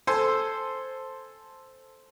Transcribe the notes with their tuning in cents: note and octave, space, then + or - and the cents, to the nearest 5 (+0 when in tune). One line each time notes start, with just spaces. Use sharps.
A4 +0 C5 +0 G#5 +0